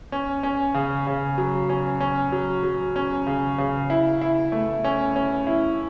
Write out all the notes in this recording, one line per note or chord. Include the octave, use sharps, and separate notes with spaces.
C#4
C#4
C#3
C#3
F#3
C#4
C#4
F#3
F#3
C#4
C#3
C#3
E4
E4
A3
C#4
C#4
E4